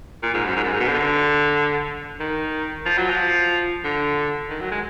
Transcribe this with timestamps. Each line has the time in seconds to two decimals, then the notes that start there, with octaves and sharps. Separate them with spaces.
0.23 A#2
0.34 G#2
0.45 F#2
0.56 G#2
0.64 F#2
0.72 G#2
0.80 B2
0.89 D3
2.20 D#3
2.86 F3
2.98 F#3
3.10 F3
3.84 D3
4.50 D#3
4.60 F#3
4.72 G#3